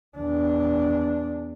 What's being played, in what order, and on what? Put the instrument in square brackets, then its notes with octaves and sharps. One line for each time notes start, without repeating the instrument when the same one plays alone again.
[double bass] E2 D4